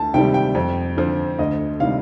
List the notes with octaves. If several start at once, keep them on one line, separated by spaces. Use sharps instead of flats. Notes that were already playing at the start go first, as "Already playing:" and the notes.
Already playing: D2 A5
C3 D#3 G3 G5
G5
F2
D3 F3
D2 D#5
C3 D#3 G3 F5